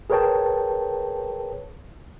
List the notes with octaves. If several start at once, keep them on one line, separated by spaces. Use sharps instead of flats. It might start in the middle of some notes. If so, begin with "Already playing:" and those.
G#4 A#4 B4 C#5 G5 A5